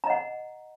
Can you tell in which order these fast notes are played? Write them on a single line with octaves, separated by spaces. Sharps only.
A#5 D#5 F#5